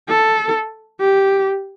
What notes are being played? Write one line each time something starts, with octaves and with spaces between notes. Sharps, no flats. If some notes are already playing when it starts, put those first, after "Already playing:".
A4
G4